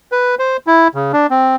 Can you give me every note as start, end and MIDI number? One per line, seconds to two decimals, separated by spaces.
0.12 0.35 71
0.39 0.57 72
0.67 0.88 64
0.95 1.12 49
1.13 1.27 62
1.30 1.56 60